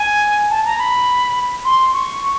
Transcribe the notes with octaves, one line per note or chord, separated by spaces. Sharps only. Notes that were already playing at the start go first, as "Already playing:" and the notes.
Already playing: G#5
A5
A#5
B5
C6
C#6